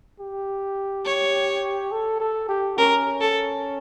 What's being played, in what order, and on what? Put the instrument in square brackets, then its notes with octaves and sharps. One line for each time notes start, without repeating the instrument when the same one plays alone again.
[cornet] G4
[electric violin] C#5
[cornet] A4
A4
G4
[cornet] C#4 [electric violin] A#4
[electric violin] A4